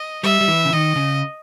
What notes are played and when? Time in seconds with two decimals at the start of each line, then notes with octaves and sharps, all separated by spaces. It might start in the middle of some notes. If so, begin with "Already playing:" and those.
Already playing: D#5
0.23 G3 E5
0.41 G3
0.48 E3
0.65 C#3
0.73 D#3 D#5
0.96 C#3